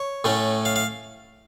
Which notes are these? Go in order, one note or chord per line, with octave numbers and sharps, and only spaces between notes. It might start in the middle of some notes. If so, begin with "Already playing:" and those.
Already playing: C#5
A2 A3 C#4
F5
F5